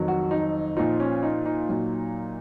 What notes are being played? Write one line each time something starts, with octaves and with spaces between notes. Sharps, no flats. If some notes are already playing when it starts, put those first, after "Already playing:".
Already playing: F2 D#3 F#3
F#4
D#4
A#2 F3 D#4
C#4
D#4
D#4
A#2 F#3